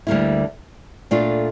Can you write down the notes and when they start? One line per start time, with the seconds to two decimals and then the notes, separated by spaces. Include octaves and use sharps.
0.07 D2 D3 G3 A#3 E4
1.11 A#2 A3 D4 F4